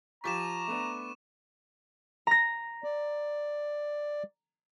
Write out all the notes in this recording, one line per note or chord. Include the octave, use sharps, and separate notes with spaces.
F3 G4 A#5 C#6 D6 B6 E7
A3 B3 D4
A#5 A#6
D5